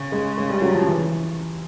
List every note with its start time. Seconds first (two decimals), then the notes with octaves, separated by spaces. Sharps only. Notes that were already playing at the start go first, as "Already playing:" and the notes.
Already playing: C#3
0.12 G#3
0.38 G#3
0.50 G3
0.62 F#3
0.75 F3
0.87 E3